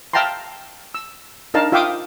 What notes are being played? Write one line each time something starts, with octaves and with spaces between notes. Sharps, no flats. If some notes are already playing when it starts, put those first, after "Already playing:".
E5 F5 G5 A5 A#5 C6
E6
D4 D#4 A#4 F5 A5
F4 E5 F5 G5 D6 D#6